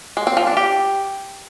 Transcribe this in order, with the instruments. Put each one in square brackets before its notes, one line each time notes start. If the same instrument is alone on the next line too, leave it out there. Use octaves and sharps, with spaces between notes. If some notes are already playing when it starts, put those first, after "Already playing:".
[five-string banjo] G#3
C4
F3
D4
G4